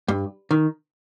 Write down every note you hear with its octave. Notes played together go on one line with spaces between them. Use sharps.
G2
D#3